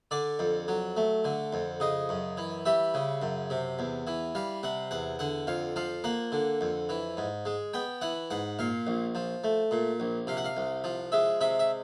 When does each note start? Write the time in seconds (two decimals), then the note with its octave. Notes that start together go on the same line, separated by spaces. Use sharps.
0.11 D3 D5
0.39 F2
0.68 F#3
0.97 A3
1.25 D3
1.53 F2
1.80 C#3 D#5
2.09 F#2
2.37 E3
2.66 G3 E5
2.94 C#3
3.22 F#2
3.50 C3
3.79 E2
4.07 E3
4.35 G3 F5
4.63 C3 F#5
4.91 E2 F#5
5.19 D3 F#5
5.47 F2 F5
5.76 F3 F5
6.04 A#3 F#5
6.32 D3
6.61 F2
6.89 E3
7.17 G#2
7.45 G#3
7.74 B3 G5
8.01 E3 F#5
8.31 G#2 F#5
8.59 A#2 F5
8.87 A#1
9.15 F3
9.44 A3
9.71 A#2
10.00 A#1
10.27 C3 F5
10.37 F#5
10.45 F5
10.57 C2
10.84 F3
11.12 G#3 E5
11.41 C3 E5
11.59 E5